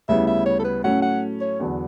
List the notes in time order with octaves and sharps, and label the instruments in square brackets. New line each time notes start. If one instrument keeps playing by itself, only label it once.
[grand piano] D2 C#3 G3 B3 E4 [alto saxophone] E5
[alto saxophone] E5
C#5
A4
B4
[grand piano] A2 F#3 A3 C#4 [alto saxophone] F#5
[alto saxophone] F#5
C#5
[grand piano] E2 D3 F#3 B3 D4